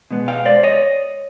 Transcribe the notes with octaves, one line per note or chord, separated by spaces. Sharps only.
B2 G#3 B3
F5 G5
C5 D5
C#5 D#5